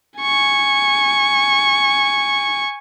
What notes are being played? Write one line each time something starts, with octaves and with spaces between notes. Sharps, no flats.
G#5 C#6